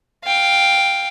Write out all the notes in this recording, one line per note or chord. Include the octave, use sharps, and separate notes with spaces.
F5 G5